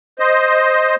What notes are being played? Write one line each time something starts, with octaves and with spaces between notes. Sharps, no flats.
C5 D#5